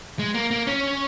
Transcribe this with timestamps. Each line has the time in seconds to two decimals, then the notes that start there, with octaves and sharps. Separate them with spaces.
0.19 G#3
0.34 A#3
0.51 A#3
0.67 C#4